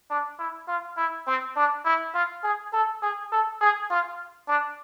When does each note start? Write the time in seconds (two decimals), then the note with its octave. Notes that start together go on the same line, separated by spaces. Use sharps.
0.10 D4
0.39 E4
0.68 F4
0.97 E4
1.27 C4
1.56 D4
1.85 E4
2.14 F4
2.44 G#4
2.73 A4
3.02 G#4
3.32 A4
3.61 G#4
3.90 F4
4.48 D4